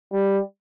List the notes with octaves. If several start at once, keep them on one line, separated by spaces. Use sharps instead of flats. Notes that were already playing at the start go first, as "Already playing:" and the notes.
G3